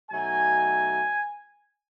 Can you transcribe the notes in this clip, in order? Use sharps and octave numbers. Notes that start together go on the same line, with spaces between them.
B2 F#3 A3 D#4 G#5